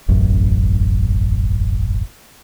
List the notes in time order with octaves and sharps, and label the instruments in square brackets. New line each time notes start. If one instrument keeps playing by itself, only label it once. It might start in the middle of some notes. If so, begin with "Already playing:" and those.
[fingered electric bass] E1 A1 F#2